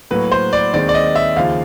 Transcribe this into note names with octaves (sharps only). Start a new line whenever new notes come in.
A2 F#3 A#3 B4
C5
D5
D#2 D#3 G#3 C4 D5
D5
D#5
E5
D#2 C#3 F3 F5